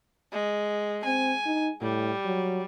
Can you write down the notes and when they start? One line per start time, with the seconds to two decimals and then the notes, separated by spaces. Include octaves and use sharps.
0.32 G#3
1.05 C4 G#5
1.46 D#4
1.81 A2 G3
2.25 F#3